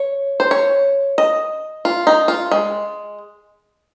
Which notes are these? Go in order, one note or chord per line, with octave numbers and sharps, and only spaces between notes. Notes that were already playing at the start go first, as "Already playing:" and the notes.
Already playing: C#5
C5
C#5
D#5
F4
D#4
F4
G#3